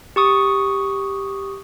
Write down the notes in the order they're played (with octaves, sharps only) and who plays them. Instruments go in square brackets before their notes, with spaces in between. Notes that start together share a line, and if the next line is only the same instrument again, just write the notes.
[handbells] G4 C#6 D#6